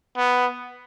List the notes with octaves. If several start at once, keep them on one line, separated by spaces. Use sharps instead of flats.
B3